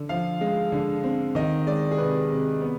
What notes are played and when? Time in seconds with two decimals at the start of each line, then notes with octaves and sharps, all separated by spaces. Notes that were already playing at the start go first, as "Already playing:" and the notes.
Already playing: D3
0.09 F3 F5
0.41 G#3
0.72 D3
1.04 C4
1.35 D#3 D#5
1.67 G#3 D5
1.91 G#4
1.98 C3 B4
2.29 C3
2.61 B3